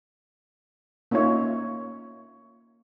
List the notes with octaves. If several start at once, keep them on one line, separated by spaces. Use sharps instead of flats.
A#3 C#4 D#4 F4 C#5 E5